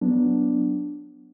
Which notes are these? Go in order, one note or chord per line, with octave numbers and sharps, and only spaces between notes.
F#3 B3 D4